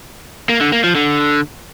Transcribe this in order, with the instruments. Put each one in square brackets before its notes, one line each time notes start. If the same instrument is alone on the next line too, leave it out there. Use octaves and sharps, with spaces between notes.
[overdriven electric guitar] A#3
D3
A#3
F3
D3